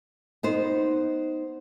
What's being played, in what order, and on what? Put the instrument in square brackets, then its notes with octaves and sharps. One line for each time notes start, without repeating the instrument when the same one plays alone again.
[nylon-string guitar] B3 D#4 C5